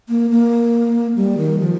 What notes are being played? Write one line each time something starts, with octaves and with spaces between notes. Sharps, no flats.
A#3
A#3
G3
D#3
F3